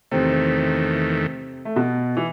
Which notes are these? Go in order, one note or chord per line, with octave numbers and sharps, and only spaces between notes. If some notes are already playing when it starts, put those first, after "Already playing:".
E2 C3 D#3 A3 C4
A3
B2 B3
E3